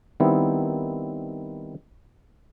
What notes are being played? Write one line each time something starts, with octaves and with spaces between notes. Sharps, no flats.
D#3 G3 B3 C4 D#4 E4